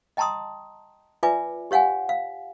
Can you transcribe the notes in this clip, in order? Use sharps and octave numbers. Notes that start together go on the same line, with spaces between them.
D#5 G5 A5 A#5 C6 D#6
F4 B4 D5 E5 G#5 D6
G4 C#5 F5 F#5 G#5
F5